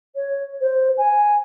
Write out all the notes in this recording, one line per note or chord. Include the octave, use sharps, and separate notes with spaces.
C#5
C5
G#5